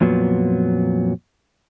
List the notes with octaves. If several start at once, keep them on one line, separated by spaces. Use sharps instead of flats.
F2 A#2 F#3 B3